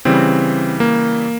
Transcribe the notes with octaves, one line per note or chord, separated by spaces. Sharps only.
C#3 E3 G3 C4
A#3